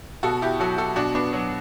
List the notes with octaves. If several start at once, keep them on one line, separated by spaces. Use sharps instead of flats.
B2 F#4 A4
E4 G4
F#3 F#4 A4
F#4 A4
B2 D4 F#4
B3 D4
F#3